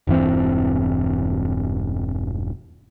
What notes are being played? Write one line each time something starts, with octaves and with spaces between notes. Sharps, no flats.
E1 G2 E3 C4